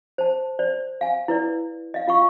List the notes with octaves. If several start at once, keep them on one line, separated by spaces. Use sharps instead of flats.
C5 A5
C5 D5
F5 G#5
E4 B4 D5
D#5 F5
F4 F5 C#6